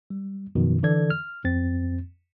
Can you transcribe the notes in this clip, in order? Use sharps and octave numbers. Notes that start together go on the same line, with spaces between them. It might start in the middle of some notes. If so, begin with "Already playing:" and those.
G3
F#2 B2 D#3 F3
D3 E3 A4 D5 G#6
F6
F2 C4 A6